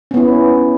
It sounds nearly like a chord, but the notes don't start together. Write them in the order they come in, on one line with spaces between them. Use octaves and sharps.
C#4 B3 E4